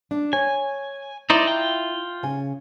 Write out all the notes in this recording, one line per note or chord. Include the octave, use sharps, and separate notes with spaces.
D4
C#5 G#5
D#4 E4 C5 D5
F4 G5
C#3 G#5